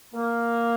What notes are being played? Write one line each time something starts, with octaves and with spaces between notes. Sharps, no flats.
A#3